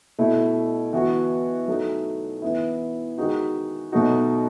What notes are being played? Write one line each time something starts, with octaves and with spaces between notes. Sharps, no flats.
B2 A3 E4
E3 B3 F#4
F#3 A3 D#4
E3 B3 E4
D#3 G#3 D#4 F#4
B2 F#3 A3 D#4 F#4